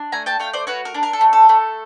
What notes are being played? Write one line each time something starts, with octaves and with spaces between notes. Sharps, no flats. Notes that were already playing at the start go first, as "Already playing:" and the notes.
Already playing: D4
A3 G#5 A#5
G5 A5
A3 F5 G5
C5 D5
F#4 B4 C#5
A#4
D4
A#4
A4
A3
A4
A3